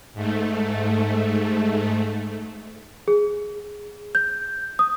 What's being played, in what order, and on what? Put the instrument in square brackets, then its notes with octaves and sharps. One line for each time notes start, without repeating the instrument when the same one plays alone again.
[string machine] G#2 A3
[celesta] G#4
G6
D#6